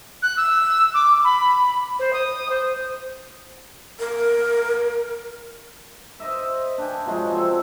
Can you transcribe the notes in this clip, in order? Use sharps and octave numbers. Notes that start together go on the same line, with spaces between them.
F#6
E6
D6
B5
C5
D#6
C5
A#4
C5 D#5 E5
D4 G5 G#5
C3 F3 F#3 G#3
C4 A4